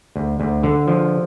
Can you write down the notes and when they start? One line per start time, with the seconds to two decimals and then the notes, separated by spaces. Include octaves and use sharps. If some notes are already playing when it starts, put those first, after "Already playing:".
0.16 D2
0.40 D2
0.63 D3
0.87 F3